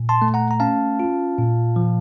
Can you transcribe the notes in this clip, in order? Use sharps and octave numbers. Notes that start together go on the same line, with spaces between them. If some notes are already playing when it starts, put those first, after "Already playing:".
Already playing: A#2
A5 C6
A3
F#5 A#5
A#5
C#4 F5 A5
F4
A#2
F3